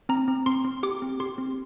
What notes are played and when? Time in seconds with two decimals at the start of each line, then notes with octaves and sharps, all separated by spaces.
0.09 C4 A#5
0.28 C4
0.46 C4 C6
0.64 C4
0.83 G4 D6
1.02 C4
1.20 G4 C6
1.38 C4